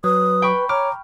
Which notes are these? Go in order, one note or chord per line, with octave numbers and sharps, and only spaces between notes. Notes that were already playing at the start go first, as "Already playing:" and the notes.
F#3 B4 D#6
G5 B5 C#6
C#5 A#5 D6 F6